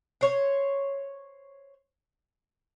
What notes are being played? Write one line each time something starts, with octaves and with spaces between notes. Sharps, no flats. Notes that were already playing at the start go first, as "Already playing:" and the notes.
C5 C#5